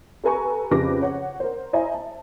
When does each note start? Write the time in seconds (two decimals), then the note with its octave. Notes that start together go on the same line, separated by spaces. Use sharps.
0.24 G4 A4 B4 G#5 A#5 C#6
0.71 F2 C#3 G4 B4 D6 A#6
1.02 C#5 F#5
1.40 A#4 C5
1.73 E4 C5 D#5 E5 G#5 A#5
1.94 A5